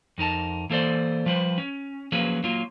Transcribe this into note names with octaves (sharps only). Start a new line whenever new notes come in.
F2 D#4 A#4 A5
E3 A#3 A4 C5 D5
F3 G3 B4 C5
C#4
F3 F#3 A#3 C#4 G#4 B4
F#3 A#3 F4